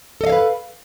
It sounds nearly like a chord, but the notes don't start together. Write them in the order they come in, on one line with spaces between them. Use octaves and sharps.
A4 D#5 F5 C#5 B4